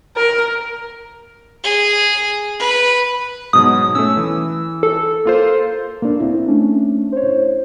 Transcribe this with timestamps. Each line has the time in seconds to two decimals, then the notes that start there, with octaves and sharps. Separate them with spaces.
0.16 A#4
1.64 G#4
2.59 B4
3.53 G#2 B2 F#3 D#6
3.95 A3 C#4 E6
4.17 E3
4.83 A4
5.25 A#3 F4 C5
6.02 A#3 D4
6.20 C4 E4
6.48 A3 C#4 D4
7.12 C5 C#5